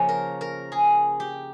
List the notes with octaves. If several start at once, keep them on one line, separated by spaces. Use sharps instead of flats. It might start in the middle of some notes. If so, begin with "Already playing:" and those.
Already playing: C#3 F3 A#3 C#4
A#4
A#4
G#4
G4